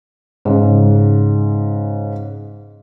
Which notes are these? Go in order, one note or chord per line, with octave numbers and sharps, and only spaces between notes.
G#2 C#3